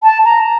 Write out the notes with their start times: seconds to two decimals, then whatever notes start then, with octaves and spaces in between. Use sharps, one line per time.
0.03 A5
0.25 A#5